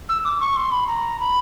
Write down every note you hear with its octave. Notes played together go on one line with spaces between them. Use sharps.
E6
D6
C#6
C6
B5
A#5
B5